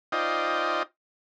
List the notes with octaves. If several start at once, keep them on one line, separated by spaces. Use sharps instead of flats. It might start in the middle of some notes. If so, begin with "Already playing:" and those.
D#4 F4 C5 D5 D#5 G5